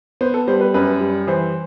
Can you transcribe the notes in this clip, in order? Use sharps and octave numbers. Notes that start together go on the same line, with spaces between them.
B3 C5
A4
G3 C5
B4
F#2 B4
G3
E3 C5